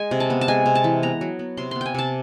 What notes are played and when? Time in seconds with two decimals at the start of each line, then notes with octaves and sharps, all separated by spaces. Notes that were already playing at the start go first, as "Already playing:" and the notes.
Already playing: G#3 G#5
0.11 C3
0.20 A5
0.30 B3
0.41 A5
0.48 G#3 G#5
0.66 C3
0.75 A5
0.84 E3
1.03 B3 A#5
1.21 F#3
1.39 B3
1.57 C3 C6
1.71 B3 C6
1.81 G5 G#5
1.94 C3 A5